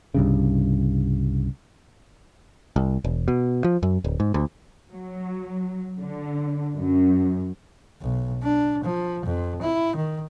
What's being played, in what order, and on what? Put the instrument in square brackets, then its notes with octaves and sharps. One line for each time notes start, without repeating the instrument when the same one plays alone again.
[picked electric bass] C2 G2 C#3
C2
E1
B2
F3
F#2
D1
G#2
D2
[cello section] F#3
D3
F#2
[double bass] B1
D4
F3
F2
E4
D#3